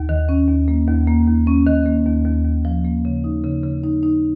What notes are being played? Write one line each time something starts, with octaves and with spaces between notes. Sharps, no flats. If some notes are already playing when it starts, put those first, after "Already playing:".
Already playing: D#2
D#3
C#4
D#2
A#3
D#2
A#3
D#2
C#4
D#3
A#3
D#2
D#2
D#2
F3
A#3
C#3
D#4
C#3
C#3
D#4
D#4